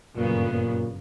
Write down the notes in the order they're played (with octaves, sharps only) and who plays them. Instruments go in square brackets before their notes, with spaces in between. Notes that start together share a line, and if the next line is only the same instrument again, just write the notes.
[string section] G1 F#2 C#3 F#3 B3 [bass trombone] A#2
[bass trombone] A#2